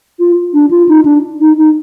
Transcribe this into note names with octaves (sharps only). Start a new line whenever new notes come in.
F4
D4
F4
D#4
D4
D#4
D#4